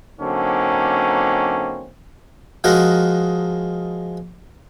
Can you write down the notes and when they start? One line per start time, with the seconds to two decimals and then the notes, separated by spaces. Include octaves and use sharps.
0.20 D3 F#3 A#3 C4 C#4 D#4
2.64 F3 G#3 D#4 F#4 A#4